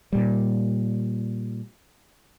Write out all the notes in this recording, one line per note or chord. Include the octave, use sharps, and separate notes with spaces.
A#2 G3